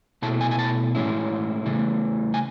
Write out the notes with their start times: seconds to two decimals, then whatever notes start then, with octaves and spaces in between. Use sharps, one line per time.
0.22 B2 A3 E4 A5
0.41 G#5
0.51 G#5
0.59 A5
0.95 A2 E3 G#3 C#4 E4
1.66 C#3 E3 A3
2.34 G#5